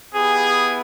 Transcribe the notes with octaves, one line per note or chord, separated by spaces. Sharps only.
B3 E4 G4 G#4